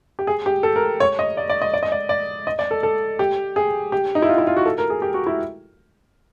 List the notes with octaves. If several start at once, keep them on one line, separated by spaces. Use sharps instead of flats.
G4
G#4
G4
A4
A#4
C#5
D#5
D5
D5
D#5
D5
D#5
D5
D5
D#5
D5
A4
A4
G4
G#4
G4
D#4
E4
F4
E4
F4
F#4
A4
A#4
G#4
G4
F#4
E4